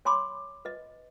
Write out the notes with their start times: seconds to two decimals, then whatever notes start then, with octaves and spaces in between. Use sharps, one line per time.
0.05 C#5 G#5 B5 C6 D6
0.65 B4 D#5